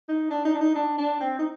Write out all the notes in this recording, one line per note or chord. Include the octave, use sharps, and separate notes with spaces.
D#4
D4
D#4
D4
D#4
D4
D4
C4
D#4